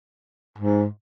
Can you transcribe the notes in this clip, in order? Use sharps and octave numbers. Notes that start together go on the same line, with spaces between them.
G#2